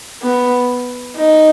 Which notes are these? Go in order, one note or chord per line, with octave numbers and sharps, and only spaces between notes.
B3
D#4